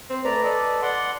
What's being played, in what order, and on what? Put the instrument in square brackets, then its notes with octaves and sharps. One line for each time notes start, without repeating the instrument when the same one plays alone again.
[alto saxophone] C4
[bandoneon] A3 D5 A#5 [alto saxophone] B4
[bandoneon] A4 D5 D#5
D5 F#5 C6